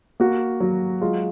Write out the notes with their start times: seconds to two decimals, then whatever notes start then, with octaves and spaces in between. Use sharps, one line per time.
0.20 A#3 F#4
0.60 F#3
1.01 G#3 F4